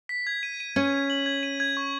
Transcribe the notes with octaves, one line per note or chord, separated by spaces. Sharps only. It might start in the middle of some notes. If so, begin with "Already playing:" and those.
B6
G#6
D#7
D#7
C#4 G#6
G#6
F#7
G#6
D#7
G#6
C#6